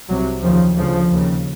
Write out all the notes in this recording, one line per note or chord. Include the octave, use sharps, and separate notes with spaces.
C2 C3 F#3
D#2 C#3 F3
D2 C#3 F3
D#2 C#3